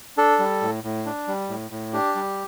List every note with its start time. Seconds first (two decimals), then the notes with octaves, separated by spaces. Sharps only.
0.17 D4 A4
0.39 G3
0.62 A2
0.84 A2
1.06 D4
1.28 G3
1.49 A2
1.71 A2
1.93 D4 G4
2.15 G3